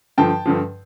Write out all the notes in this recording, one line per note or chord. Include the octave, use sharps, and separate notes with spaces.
G2 D3 F3 G5 A5
G2 D3 F3